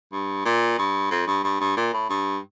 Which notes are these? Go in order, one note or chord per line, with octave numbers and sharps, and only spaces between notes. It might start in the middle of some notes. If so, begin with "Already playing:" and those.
G2
A#2
G2
F2
G2
G2
G2
A#2
A2
G2